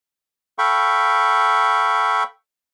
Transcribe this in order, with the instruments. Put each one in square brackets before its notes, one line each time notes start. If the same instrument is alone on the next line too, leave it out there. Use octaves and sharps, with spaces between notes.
[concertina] A4 F5 G5 B5 C#6